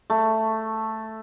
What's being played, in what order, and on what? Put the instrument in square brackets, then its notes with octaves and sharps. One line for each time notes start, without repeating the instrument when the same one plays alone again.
[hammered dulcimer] A3